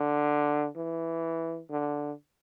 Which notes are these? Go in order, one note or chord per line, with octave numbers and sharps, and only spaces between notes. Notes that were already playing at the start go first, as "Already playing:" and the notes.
Already playing: D3
E3
D3